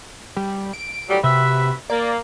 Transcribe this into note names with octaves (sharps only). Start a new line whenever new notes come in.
G3
D7
A2 F#3 G3
C3 F#4 B4 E5
A#3 D5